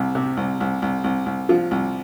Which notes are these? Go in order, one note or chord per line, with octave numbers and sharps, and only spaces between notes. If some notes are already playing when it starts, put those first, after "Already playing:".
Already playing: C2 C3
C3
C2
C2
C2
C2
C2
F3 F4
C2